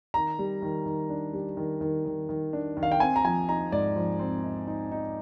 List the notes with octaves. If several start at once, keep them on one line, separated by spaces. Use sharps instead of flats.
D#3 A#5
G3
D#3
D#3
D4
G3
D#3
D#3
D#3
D#3
D4
D#3
F5
G5
C4 G#5
A#5
F3 G#5
D#4 A#5
G#2 D5
F3
C4
D#4
D#4
D#4